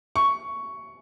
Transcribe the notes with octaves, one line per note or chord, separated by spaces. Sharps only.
C#6